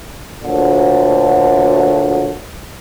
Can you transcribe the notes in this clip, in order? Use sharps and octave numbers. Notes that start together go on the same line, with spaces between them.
D2 A#2 D3 F#3